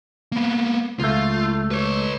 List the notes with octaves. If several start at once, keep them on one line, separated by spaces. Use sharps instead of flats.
A#3 B3
C#2 A3 F4
B4 C#5